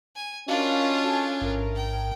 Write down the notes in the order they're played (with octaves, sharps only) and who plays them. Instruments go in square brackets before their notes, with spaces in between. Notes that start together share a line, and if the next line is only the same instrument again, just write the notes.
[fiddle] G#5
[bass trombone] C#4 [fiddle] D4 F4 [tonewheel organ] F#4 D#5 [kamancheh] A#4 F5
[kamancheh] A4 G#5
[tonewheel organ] A1 G#2 [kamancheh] A#4
[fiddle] G5